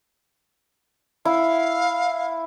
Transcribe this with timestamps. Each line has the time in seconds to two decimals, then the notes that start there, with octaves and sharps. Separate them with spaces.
1.25 E4 F5